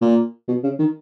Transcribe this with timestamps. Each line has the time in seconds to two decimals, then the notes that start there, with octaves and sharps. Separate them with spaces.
0.02 A#2
0.48 B2
0.63 C#3
0.79 D#3